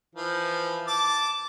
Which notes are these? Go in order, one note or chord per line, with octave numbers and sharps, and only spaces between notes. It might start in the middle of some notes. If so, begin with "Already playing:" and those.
E3 F3
A5 D6